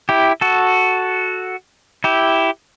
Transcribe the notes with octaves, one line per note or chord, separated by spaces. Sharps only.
E4 G4
F#4 A4
E4 G4